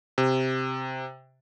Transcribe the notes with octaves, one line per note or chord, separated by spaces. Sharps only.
C3